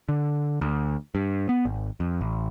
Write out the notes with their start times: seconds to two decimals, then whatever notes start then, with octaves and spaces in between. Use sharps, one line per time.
0.09 D3
0.61 D2
1.15 G2
1.49 B3
1.65 G#1
2.00 F2
2.21 A1